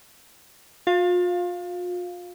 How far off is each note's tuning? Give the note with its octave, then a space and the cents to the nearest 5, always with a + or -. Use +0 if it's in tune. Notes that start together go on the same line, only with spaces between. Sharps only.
F4 +40 F5 +0